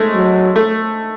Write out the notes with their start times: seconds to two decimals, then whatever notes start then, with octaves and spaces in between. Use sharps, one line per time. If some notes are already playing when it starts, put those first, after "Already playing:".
Already playing: G#3 A3
0.15 F#3
0.56 A3